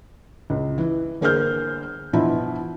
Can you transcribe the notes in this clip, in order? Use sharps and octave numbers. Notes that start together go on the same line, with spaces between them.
C#2
E3
G1 A#3 G#4 C5 F6 G6
G2 B2 E3 F3 E4